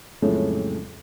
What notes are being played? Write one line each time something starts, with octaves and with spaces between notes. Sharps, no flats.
F2 A2 C#3 F#3 G#3 A3